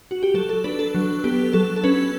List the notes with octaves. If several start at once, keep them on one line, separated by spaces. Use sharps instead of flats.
F#4
G4
F#3 A4
A4
D4 B4
A4
F#3
B3 G4
F#3 A4
A4
C#4 B4